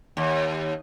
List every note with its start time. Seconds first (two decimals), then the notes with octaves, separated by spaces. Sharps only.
0.17 D#2